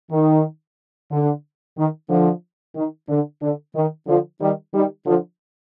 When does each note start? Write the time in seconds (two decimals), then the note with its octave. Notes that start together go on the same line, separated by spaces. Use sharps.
0.11 D#3
1.10 D3
1.76 D#3
2.09 D3 F3
2.75 D#3
3.08 D3
3.41 D3
3.74 D#3
4.07 D3 F3
4.40 D#3 G3
4.73 D#3 G3
5.06 D3 F3